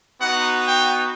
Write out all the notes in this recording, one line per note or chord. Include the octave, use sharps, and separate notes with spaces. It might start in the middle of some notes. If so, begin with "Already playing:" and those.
B3 D#4 F#4 F#5
G5